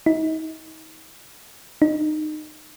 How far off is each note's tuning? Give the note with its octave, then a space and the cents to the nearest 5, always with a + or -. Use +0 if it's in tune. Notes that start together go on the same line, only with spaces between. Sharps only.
D#4 +35
D#4 -25